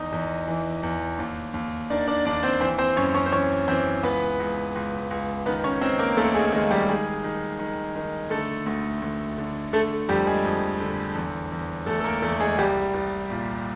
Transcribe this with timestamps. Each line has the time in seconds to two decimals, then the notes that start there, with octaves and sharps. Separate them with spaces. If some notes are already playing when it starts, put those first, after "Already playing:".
Already playing: E2 D#4 D#5
0.12 E2
0.48 E3
0.83 E2
1.19 D#2
1.54 D#2
1.90 D#3 D4 D5
2.07 D4 D5
2.25 D#2 D4 D5
2.43 C4 C5
2.61 E3 C4 C5
2.78 C4 C5
2.97 F#2 C#4 C#5
3.14 C#4 C#5
3.26 C5
3.32 E3 C#4 C#5
3.68 E3 C4 C5
4.03 C#2 B3 B4
4.40 C#2
4.75 C#2
5.11 C#2
5.46 D#3 B3 B4
5.64 C#4 C#5
5.81 D#3 C4 C5
5.99 A#3 A#4
6.17 D#2 A3 A4
6.35 G#3 G#4
6.53 D#3 G#3 G#4
6.71 G3 G4
6.89 D#3 G#3 G#4
7.24 D#3
7.59 D#3
7.96 D#3
8.30 D3 A3 A4
8.66 D2
9.02 D2
9.38 D3
9.73 D3 A3 A4
10.09 F2 G3 G4
10.26 G#3 G#4
10.45 F2
10.80 D3
11.15 E2
11.52 E2
11.86 E2 A3 A4
12.00 A4
12.04 A#3 A#4
12.22 E2 A3 A4
12.40 G#3 G#4
12.58 C2 G3 G4
12.94 C2
13.30 A#2